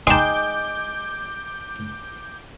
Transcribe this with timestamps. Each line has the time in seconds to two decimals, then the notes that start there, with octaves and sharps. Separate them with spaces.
0.07 G#3 D#4 G5 A5 A#5 D6 D#6 G6